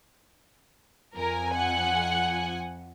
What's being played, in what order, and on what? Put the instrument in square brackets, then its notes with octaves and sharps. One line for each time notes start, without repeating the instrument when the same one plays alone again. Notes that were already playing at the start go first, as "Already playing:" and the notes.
[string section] F2 G#5 [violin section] A#4
[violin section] F#5 F#6